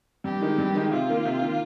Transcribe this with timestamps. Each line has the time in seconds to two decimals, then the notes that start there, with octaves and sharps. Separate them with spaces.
0.24 G2 G4
0.41 D#3 G#3 D#4
0.58 G2
0.75 D#3 G#3 D#4
0.92 C3 F4
1.09 D#3 A#3
1.25 C3
1.42 D#3 A#3